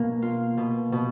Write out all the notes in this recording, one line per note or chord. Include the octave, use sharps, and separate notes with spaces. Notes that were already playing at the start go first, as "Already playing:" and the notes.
Already playing: B2 A#3
F4
B2
B2